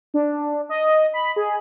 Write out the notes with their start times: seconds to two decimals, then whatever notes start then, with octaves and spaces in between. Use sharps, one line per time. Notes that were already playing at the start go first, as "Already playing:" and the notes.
0.14 D4
0.69 D#5
1.14 B5
1.36 G#4